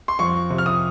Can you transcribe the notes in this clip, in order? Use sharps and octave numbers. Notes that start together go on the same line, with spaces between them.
C6
F2 C#6
C3
F6
D#6